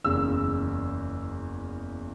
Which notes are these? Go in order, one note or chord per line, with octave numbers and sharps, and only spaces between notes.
F#1 E2 C#3 E6